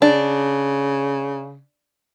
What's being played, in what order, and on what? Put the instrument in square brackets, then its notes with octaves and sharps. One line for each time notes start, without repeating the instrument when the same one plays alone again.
[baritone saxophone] C#3 [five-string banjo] D4